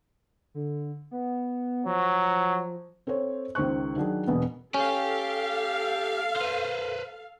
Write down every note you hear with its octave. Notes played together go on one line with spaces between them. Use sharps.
D3
B3
F3 F#3
C4 A4 C5 C#5
C#2 D#3 C5 C#6 F#6
D#3 F#3 D4 G#4
E1 B2 B3
C#4 G4 A4 F5
B4 C5